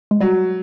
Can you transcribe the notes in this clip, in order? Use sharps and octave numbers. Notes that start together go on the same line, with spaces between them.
G#3
F#3 G3